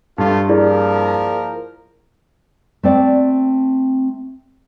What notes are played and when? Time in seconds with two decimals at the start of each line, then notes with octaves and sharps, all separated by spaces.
0.18 G2 G3 A3 F4
0.49 F3 A#3 E4 G#4 A#4 D5
2.83 A3 C4 D5